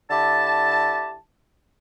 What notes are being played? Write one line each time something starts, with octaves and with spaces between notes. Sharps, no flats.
D3 E4 G4 A5